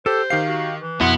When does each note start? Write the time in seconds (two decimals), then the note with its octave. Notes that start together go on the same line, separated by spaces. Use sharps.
0.06 G4 A4 C5
0.30 D#3 G4 F5 C7
0.47 F#4
0.80 E3
1.01 F2 B2 B3 E4 F#5 C6